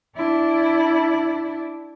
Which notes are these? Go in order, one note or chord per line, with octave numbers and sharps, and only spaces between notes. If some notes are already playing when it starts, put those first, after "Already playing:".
D4 E4